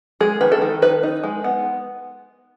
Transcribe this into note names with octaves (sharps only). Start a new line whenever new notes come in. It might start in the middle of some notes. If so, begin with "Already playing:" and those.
G#3 G#4
D#3 B4
A4
D#3
D#4 B4
D#4
G#3
B3